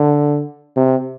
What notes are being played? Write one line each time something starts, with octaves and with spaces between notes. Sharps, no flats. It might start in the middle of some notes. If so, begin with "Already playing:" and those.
Already playing: D3
C3